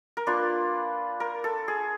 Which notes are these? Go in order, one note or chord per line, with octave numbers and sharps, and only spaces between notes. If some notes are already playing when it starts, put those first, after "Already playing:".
A#4
A#3 D4 F4 B4
A#4
A4
G#4